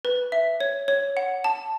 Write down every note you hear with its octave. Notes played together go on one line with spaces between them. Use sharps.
B4
E5
C#5
C#5
F#5
A5